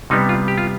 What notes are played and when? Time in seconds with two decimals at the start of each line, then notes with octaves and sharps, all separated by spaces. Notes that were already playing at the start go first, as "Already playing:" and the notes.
0.10 C3 G3 B3 D#4
0.29 F4
0.48 G4
0.58 F4